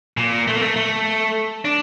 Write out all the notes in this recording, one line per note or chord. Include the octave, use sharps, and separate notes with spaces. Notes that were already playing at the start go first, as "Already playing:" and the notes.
A#2
A3
A#3
A3
A3
D4